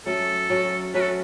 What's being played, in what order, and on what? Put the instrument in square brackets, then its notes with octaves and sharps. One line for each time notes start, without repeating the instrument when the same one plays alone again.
[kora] F#3 A3 C#4 [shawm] A4
[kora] F#3 A3 C#4
[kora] F#3 A3 C#4 [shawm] B4
[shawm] A4